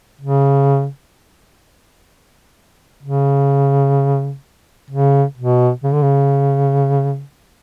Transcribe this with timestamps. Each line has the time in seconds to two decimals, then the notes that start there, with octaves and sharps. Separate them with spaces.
0.21 C#3
3.03 C#3
4.91 C#3
5.38 B2
5.84 C#3
5.93 D3
6.02 C#3